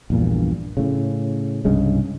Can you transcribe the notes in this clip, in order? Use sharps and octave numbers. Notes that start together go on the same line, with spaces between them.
A#1 E2 G2 A#2
A2 C#3
C2 G2 C#3 G#3